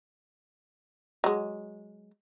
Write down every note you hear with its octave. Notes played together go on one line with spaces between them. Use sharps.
F#3 G#3